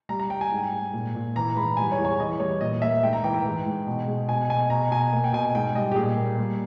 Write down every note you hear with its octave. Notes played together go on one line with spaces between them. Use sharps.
G3 A#5
A#5
G3 G5
G#5
G#2
G#2
A#2
A#2
E3 A#5
G#2 B5
G3 G#5
C#5
E2
C#5
E3 D#5
G3 C#5
A#2 D#5
A#3 E5
G#2 G5
A#5
E3 G5
G5
G#2
G#2
B2
G#3
B2 G#5
B2 G#5
B2 A#5
B2 G#5
A#3 G#5
G5
B2 G#5
G#2 G5
G3 D#5
G4
A#2 G#4
A#3
G3